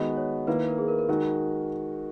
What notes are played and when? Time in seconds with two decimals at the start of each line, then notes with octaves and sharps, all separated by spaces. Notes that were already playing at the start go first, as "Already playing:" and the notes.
Already playing: D#3 G#3 B3 F#4 D#5
0.17 C#5
0.47 D#3 A#3 E4 B4
0.68 A#4
0.78 G#4
0.88 A#4
0.99 A#4
1.09 D#3 G#3 D#4 F#4 A#4